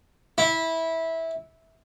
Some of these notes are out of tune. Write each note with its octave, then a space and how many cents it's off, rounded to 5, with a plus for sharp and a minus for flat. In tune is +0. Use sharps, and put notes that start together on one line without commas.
E4 -15